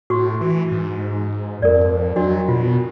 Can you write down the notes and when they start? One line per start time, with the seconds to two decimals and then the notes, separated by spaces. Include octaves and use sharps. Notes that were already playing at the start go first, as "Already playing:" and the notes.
0.10 A2 F#4 C#6
0.41 E3
0.71 G#2
1.62 F2 A#4 D5
2.16 F#3 D4 F#4 D#5
2.48 B2 F4